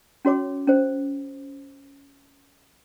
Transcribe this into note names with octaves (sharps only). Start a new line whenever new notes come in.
C#4 F#4 C#5 D6
C#4 C5